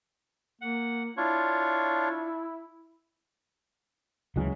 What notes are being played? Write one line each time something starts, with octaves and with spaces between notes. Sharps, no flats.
A#3 F#5
D4 E4 F4 C#5
D2 C#3 E3 F#3 G#3 C#4